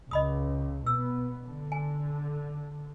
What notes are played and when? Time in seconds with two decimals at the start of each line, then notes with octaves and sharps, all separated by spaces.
0.11 C#2 D#5 B5 D#6
0.86 B2 B3 E6
1.43 D3
1.72 G#5